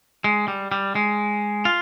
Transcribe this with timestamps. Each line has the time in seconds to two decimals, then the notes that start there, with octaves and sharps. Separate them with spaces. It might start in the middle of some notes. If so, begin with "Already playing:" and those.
0.24 G#3
0.48 G3
0.72 G3
0.95 G#3
1.65 F4